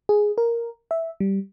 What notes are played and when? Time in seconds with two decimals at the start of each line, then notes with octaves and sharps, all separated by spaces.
0.09 G#4
0.38 A#4
0.91 E5
1.20 G3